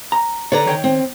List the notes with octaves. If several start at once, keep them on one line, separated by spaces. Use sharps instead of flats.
A#5
D3 B4 C#5 D5 A#5
D#3 C#5 G5
C4